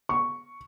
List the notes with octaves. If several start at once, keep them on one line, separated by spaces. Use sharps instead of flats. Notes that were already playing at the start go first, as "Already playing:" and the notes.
C#6